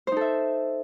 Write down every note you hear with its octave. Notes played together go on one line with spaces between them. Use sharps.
D#4 A4 C5 E5